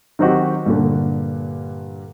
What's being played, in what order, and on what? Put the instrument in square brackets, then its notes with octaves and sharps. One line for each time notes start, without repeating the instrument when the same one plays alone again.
[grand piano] D#3 F#3 C4 D#4 F#4 G4
G2 A#2 D3